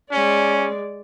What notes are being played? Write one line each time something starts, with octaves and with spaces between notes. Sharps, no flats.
G#3 C#4 D5